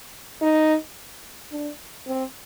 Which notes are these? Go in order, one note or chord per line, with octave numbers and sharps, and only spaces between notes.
D#4
D4
C4